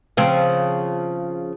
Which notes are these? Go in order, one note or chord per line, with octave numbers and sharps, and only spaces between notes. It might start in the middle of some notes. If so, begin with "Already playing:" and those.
C#3 F3 C4